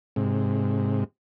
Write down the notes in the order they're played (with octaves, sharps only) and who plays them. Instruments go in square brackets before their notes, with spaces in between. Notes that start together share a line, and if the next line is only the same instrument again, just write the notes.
[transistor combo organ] G#2 C3